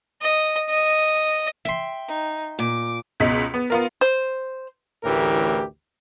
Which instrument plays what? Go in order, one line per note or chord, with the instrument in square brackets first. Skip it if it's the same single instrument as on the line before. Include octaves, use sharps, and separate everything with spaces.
[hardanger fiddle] D#5
D#5
[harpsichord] E5 C6 [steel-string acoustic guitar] G5
[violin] D#4
[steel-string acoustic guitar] A#2 [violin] D6
[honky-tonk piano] C#2 B2 D#5 B6
B3
B3 F4 A#4
[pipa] C5
[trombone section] A1 D2 A2 E3 G4 A#4